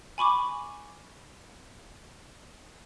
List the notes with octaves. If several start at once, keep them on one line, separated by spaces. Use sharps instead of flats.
G#5 B5 C#6 D6